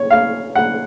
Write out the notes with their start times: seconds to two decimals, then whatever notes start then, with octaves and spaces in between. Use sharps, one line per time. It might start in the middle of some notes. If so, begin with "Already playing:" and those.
Already playing: C#5
0.10 F5
0.55 F#5